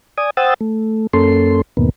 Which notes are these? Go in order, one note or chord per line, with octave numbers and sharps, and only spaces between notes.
D5 G#5 D#6
C5 F#5 G5 D#6 E6 A6
A3
F#2 A#3 C#4 A4 C6
E2 G#2 B2 D#3 A#3 B3